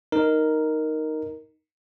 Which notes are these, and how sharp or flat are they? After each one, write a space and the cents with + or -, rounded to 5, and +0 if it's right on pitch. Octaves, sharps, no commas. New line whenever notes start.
D#4 +0 A#4 +0